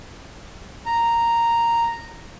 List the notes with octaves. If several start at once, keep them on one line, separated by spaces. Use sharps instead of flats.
A#5